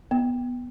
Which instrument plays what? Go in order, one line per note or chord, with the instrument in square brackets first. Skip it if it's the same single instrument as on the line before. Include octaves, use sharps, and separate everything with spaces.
[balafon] B3